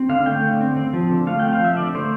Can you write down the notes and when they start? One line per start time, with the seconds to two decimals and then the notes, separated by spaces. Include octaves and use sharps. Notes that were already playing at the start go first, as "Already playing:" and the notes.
Already playing: C4
0.09 D3 F5
0.26 A3 G5
0.43 D3
0.61 C4
0.77 C4
0.93 F3
1.10 D3
1.27 A3 F5
1.40 C4 G5
1.53 F5
1.60 F3 E5
1.77 D3 D5
1.95 A3 C5